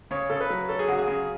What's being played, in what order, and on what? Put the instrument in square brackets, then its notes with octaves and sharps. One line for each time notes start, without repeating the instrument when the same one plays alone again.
[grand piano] C#3 [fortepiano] C#5
[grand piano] C#3 [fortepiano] A4
[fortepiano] B4
[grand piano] F#3
[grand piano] C#4 [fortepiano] A4
[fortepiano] G#4
[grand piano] C#3 [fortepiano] F#4
[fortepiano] G#4
[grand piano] C#3